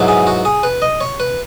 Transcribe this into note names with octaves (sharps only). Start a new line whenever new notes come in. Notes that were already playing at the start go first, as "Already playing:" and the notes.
Already playing: G#2 F#3 B3 E4
G#4
F#4
G#4
B4
D#5
C#5
B4